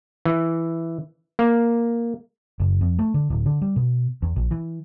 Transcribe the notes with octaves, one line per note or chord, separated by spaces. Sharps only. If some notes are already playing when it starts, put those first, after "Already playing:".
E3
A#3
F#1
F2
A3
D3
D1
D3
G3
B2
E2
A#1
E3